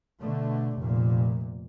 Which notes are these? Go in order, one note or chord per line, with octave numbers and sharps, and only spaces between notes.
B2 D3 A3
F1 A#2